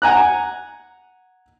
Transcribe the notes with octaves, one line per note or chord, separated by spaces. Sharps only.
F#5 G#5 A#5 F#6